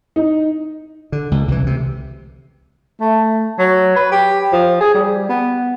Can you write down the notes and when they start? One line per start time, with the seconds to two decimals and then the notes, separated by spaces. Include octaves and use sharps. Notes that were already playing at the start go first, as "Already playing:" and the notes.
0.16 D#4
1.12 D3
1.31 C#2
1.48 C2 E3
1.66 D2 C3
3.00 A3
3.59 F#3
3.96 B4
4.12 G4
4.53 F3
4.80 G#4
4.94 G3
5.29 B3